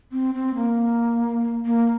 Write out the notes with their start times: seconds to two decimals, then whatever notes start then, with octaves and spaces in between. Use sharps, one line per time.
0.12 C4
0.34 C4
0.55 A#3
1.65 A#3